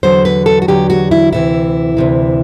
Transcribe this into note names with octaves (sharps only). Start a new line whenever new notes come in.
E2 D3 F#3 C5
B4
A4
F#4
E2 D3 F#3 G4
F#4
E4
D2 C3 E3 E4
D2 C3 E3